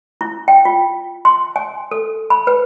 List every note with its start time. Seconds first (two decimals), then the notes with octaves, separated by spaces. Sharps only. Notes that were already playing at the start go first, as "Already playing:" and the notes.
0.21 E4
0.48 G5
0.65 F4
1.25 C6
1.56 G#5
1.91 A4
2.30 B5
2.47 B4